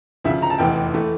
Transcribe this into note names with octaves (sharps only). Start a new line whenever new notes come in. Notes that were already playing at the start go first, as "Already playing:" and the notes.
D2 C#3 F3 E5
A#5
A5
F1 E2 E3 G5
E3 A3